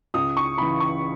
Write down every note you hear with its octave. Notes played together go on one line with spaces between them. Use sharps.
C#2 D#6
C#6
C#3 E3 B5
C#6